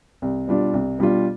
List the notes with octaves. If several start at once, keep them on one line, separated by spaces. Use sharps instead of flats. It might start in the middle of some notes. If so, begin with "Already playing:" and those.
C2
B2 G3 D4 F4
C2
B2 G3 D4 F4